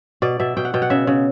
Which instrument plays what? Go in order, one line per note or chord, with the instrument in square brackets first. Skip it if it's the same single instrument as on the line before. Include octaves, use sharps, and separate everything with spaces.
[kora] B2 D5
B2 E5
B2 G5
F#5
B2 G5
F#5
C#3 E5
C#3